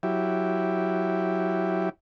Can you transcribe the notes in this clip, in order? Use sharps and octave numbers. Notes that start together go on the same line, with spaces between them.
F#3 E4 G4